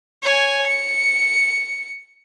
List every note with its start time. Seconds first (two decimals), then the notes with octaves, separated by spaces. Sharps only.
0.23 C#5 G#5
0.67 C#7